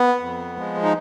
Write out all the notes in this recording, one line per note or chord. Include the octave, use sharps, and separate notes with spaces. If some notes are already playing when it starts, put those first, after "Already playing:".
Already playing: B3
F2
F3 G#3
D#4